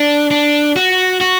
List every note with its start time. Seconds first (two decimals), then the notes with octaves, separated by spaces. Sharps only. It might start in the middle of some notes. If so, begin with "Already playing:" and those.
Already playing: D4
0.31 D4
0.76 F#4
1.21 F#4